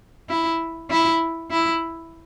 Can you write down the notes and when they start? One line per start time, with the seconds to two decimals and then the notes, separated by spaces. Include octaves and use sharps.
0.30 E4
0.90 E4
1.50 E4